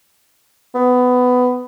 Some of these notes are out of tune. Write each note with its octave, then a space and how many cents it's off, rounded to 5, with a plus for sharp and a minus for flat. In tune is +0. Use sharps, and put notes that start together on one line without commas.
B3 +15